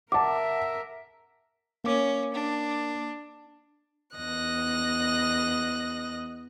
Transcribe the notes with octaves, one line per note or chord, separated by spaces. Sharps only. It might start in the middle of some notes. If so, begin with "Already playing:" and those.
A#4 E5 F#5 A5 D6
A#3 C#4 D6
D4
E2 D#5 F#6 A#6